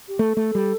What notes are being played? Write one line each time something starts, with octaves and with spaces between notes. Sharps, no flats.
G4
A3 A4
A3
G3